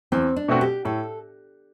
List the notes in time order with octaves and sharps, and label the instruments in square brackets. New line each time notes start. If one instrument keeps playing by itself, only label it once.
[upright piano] E2 [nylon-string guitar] C4
[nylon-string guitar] D4
[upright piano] B2 A3 C4 F#4
[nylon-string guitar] G4
[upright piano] A2 [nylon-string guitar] A4